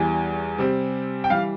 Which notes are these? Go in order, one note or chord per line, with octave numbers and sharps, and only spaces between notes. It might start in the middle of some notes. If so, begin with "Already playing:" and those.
Already playing: E2 E3 G3 G#5
C3 G3 C4
G5
E3 G3 F5